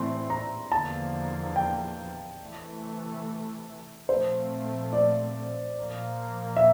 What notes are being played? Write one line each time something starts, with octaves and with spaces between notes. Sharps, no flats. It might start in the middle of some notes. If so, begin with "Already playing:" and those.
Already playing: A2 E3 A3 C4 C6
A#5
E2 D3 F3 A#3 A5
G5
C3 E3 A3
A#2 F3 A3 C4 C5
D5
A#2 F3 A#3
E5